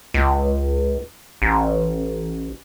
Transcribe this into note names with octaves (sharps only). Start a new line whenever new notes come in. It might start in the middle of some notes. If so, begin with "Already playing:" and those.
C#2
A1